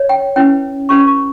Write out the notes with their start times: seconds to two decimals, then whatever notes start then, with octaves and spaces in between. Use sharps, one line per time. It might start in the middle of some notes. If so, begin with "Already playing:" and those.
Already playing: C#5
0.09 G5
0.36 C#4 E4 B4 G5
0.89 C#4 G4 B4 C#6
1.07 C#6